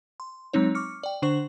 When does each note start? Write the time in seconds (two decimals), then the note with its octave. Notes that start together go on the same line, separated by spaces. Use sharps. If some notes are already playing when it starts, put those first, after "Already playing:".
0.20 C6
0.53 F#3 G#3 C4 D#4 C#5
0.75 C#6 D6 F6 C#7
1.03 D5 G5
1.22 D3 D4 C5 C#6 F#7